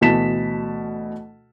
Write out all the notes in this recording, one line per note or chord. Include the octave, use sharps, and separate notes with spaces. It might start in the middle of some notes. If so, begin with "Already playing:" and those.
D2 B2 E3 A5 B6 E7